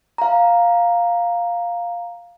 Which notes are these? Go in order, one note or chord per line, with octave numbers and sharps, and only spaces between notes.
F5 A#5